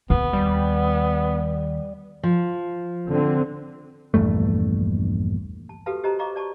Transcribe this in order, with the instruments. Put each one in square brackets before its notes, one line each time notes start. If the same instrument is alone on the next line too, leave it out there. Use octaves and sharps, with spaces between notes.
[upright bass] D#2 [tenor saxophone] B3
[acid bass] G3
[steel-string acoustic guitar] F3
[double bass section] D3 C4
[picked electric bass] A#1 E2 G2 A3
[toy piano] A5
F#4 G4 A4 B4 F5 A5
G4 C5 D#5 A5 A#5
D#5 F5 A#5 C#6 D6
D5 A5 C#6